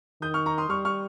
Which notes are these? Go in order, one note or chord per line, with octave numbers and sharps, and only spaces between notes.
D#3 D#6 G6
C#6 F6
A#5 C#6
C6 D#6
G3 C#6 F6
C#6 F6